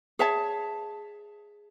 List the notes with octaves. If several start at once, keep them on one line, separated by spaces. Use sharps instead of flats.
G#4 C#5 E5 A5